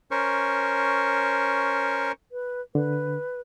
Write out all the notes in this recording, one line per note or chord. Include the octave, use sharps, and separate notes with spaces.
C#4 A#4 C5 C#6
B4
D3 B4